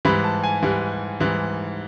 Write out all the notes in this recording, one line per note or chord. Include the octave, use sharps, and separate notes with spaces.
G#2 E3 G3 B5
A5
G#5
G#2 E3 G3
G#2 E3 G3